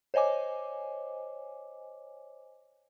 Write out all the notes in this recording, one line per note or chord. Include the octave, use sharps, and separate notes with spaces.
C5 C#5 D#5 G#5 D6